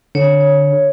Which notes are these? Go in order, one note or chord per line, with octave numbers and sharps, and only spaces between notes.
D3 C#5